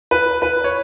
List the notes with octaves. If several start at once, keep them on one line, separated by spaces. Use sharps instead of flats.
B4
B4
C#5